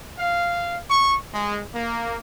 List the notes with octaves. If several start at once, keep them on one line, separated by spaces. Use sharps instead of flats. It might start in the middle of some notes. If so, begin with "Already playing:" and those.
F5
C#6
G#3
A#3